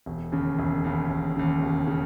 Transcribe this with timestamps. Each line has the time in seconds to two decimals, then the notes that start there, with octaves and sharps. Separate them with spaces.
0.06 E1
0.32 D#2 C#3
0.59 E1
0.84 D#2 C#3
1.10 E1
1.37 D#2 C#3
1.63 E1
1.87 C#3